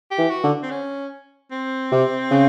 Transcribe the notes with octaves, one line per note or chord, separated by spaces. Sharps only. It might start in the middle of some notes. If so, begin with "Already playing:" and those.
G4
E3
F#4
D3
C4
C#4
C4
C3
C#3